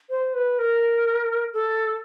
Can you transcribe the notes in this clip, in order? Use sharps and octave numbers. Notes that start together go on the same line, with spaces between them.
C5
B4
A#4
A4